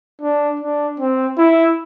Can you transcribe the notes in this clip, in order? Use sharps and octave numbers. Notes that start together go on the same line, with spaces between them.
D4
D4
C4
E4